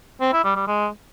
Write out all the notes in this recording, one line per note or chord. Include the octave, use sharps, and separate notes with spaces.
C4
E4
G3
G3
G#3